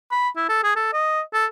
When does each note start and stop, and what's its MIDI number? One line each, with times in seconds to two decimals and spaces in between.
0.12 0.29 83
0.36 0.48 64
0.49 0.63 69
0.64 0.72 68
0.76 0.89 69
0.93 1.21 75
1.34 1.46 69